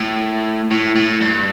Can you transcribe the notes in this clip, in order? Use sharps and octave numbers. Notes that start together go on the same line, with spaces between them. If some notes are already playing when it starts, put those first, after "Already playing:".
Already playing: A2
A2
A2
G2